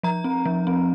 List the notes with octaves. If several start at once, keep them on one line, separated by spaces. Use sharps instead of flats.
F3 A#5
C4
F3
C4